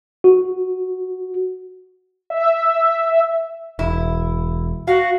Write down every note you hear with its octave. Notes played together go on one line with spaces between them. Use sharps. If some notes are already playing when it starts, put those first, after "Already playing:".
F#4
E5
E1 E4
F#4 F5